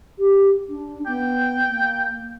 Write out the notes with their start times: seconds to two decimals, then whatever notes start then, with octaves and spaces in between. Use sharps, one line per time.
0.18 G4
0.69 D4
1.06 B3 G5
1.67 A#3